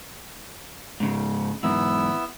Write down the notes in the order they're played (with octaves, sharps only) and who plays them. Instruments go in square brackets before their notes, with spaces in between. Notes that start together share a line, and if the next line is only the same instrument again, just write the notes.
[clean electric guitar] G#2 C#3
[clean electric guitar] E2 G#2 [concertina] B3 E4 E6